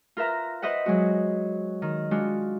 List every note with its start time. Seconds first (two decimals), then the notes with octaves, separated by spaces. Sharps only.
0.17 F4 A#4 B4 E5 A#5
0.62 B4 C5 D#5 E5 F#5
0.86 F#3 G#3 F#4
1.82 D#3
2.11 G#3 D4 F4 F#4